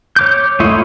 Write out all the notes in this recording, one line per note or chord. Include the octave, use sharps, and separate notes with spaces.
C#5 D6 G6
A3 E4 F4 C#5 D#5